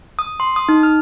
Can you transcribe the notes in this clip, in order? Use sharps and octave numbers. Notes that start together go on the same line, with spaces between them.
D#6
C6
D#6
D#4
F6